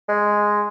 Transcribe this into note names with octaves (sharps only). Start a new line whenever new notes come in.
G#3